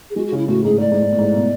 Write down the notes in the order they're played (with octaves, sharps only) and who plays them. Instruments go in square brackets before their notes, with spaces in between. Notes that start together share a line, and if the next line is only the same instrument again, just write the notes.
[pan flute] G#4
[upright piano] G#3 [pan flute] F#4
[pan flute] F#4
[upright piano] C#3
[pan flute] E4
[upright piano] A2 [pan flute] F#4
[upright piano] G#2 [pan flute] G#4
[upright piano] A2 [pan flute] D5
[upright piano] G#2
G#2
A2
G#2
A2
B2